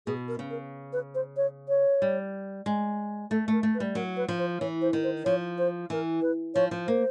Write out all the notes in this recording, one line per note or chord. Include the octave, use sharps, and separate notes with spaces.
B2 G#4
A#4
C#3
A#4
B4
C5
C#5
C#5
G3
G#3
A3 A4
A3 A#4
A3
B4
G3
F#3 A#4
B4
F3
C5
E3 C#5
C5
D#3
C5
F3 C#5
C5
E3 A#4
B4
F3 C#5
F3
A#3 C5